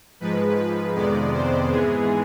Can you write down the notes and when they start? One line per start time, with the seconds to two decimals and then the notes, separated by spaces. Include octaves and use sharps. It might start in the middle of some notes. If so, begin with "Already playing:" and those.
0.20 G#2 F3 G#3 B4
0.57 B4
0.95 F2 C3 D#3 G#3 B3 D5
1.34 C5
1.70 G#2 E3 G#3 B3 G#4